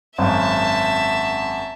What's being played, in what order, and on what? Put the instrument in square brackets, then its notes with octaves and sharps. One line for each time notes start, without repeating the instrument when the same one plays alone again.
[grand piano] G#1 F#2 [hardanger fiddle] E5 A5